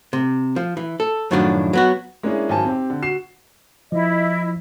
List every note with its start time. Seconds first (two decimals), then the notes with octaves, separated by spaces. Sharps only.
0.13 C3
0.56 F3
0.77 E3
1.00 A4
1.31 F#2 A2 D#3 F3 F#3 D4
1.73 F#3 B3 F#4
2.23 G#3 A#3 C#4 D4 E4 G#4
2.49 G#1 F#3 G#5 A5
2.65 C4 G4
2.90 D3
3.02 F#4 C7 E7
3.92 F3 E4 D#5